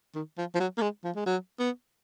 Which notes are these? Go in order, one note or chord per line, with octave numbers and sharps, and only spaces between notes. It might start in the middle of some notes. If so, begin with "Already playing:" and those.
D#3
F3
F3
F#3
A#3
G#3
F3
G#3
F#3
B3